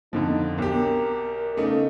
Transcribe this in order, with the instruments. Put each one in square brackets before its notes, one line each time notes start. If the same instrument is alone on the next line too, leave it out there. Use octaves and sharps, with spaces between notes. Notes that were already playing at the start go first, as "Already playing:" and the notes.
[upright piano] F2 D3 F3 [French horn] D#4
[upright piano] B1 G4 [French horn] A#4
[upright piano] C#3 A3 D#4 [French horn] B3